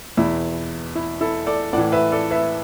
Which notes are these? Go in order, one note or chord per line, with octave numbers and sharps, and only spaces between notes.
E2 B2 E4
E4
E4 A4
A4 D5
A2 E3 D5 F#5
B4 E5
A4 D5
B4 E5